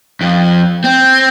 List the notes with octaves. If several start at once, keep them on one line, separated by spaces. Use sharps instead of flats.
F2
C4